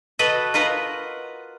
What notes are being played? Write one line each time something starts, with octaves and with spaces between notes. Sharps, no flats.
F#4 A4 B4 D#5 F#5
F4 F#4 A#4 B4 D#5 F#5